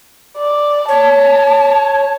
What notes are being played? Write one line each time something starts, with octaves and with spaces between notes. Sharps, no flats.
D5
C#5 A5